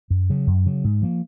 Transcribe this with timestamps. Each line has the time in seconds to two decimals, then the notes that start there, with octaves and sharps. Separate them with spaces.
0.10 F#2
0.30 C#3 F#3
0.47 F#2
0.66 C#3 F#3
0.84 G#2
1.02 F3 A#3